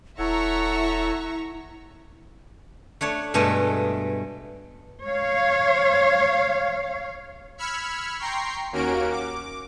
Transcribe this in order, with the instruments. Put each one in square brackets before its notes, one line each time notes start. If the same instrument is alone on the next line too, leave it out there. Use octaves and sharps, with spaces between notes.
[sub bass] D#1 [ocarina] E4 [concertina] A4 C#5 F#5 [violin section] E5 A#5 C#6
[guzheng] A3 D4 C#5
G2 B2 G#3 A3 D#5 E5
[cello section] C#5 F5
[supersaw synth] B5 E6 F6 G#6 B6 C#7
G5 A#5 C6 C#6 C7
D#2 A#3 C#4 F#4 A#4 D7
D6